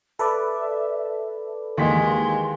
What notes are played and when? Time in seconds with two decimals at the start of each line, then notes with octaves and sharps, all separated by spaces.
0.19 A4 B4 D5 E5
1.78 D#2 E3 G#3 C6 B6